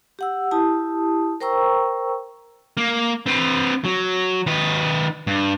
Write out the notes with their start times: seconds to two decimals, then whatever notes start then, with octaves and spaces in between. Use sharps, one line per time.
0.19 G4 F#5 E6
0.51 E4 G4 A5 D#6
1.40 A#4 C5 G5 A#5 C#6 E6
2.77 A#3
3.26 C4 B4
3.85 F#3
4.46 D#3 B4
5.27 G2